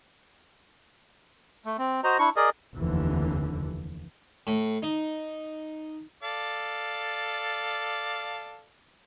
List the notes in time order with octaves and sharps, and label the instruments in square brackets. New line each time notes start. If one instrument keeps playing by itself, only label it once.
[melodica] A3
C4
F#4 C5 D#5 A#5
D4 E4 C#6
G#4 A#4 D5 D#5
[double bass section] F1 D#2 D3 E3
[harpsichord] A2
D#4
[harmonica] A4 D5 F5